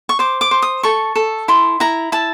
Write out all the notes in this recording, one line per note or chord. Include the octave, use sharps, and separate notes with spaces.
C#6
C5 D6
D6
C5
D#6
A4 C#6
A4
E4 C6
E4 A#5
E4 A5